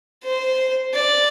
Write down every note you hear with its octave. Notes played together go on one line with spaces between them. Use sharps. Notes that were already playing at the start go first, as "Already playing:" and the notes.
C5
D5